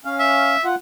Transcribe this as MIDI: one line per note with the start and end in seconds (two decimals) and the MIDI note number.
0.05 0.56 61
0.05 0.56 77
0.20 0.64 76
0.65 0.75 65
0.65 0.75 78